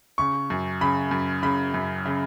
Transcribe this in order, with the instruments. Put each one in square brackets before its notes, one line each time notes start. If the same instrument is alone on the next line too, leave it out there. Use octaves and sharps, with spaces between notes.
[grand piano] C#3 C#6
F#2
C#3 B5
F#2
C#3 B5
F#2
C#3